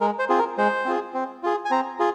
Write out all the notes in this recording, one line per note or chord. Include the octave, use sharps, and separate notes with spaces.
G#3 A#4
C5
C4 F4 G#4
A#4
G#3 C5
C4 F4 G#4
C4
F4 G#4
G#5
C4 A#5
F4 G#4